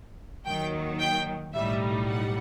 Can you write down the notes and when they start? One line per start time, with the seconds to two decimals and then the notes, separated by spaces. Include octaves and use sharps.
0.45 D#2 D#3 F#3 G5
0.99 G5
1.53 B1 A2 G3 D#4 E5
2.07 F#5